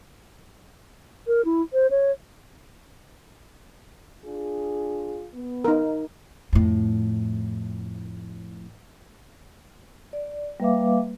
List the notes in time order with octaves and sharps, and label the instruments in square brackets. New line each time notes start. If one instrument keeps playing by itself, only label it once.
[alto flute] A#4
E4
C5
C#5
[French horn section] D4 F4 G#4
B3
[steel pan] D#4 A#4
[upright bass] F2 A2
[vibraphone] D5
G3 A#3 B4 E5 F5 D6